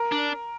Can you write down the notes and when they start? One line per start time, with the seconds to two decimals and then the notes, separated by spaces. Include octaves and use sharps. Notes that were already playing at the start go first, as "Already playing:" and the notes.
Already playing: A#4
0.12 D4